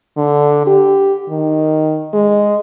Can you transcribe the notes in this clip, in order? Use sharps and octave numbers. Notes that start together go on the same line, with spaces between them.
D3
G4
D#3
G#3